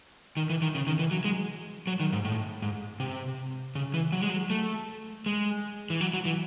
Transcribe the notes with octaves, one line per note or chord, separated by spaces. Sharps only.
D#3
E3
D#3
C#3
D#3
E3
F#3
G#3
F#3
D#3
G#2
A2
G#2
C3
C#3
E3
F#3
G#3
F#3
A3
G#3
E3
F#3
F#3
E3